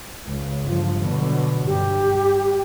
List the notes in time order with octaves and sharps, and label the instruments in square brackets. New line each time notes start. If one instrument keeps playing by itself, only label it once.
[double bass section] C#2 C#3
G1 F3
B2 D3 F#3
[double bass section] G2 [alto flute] G4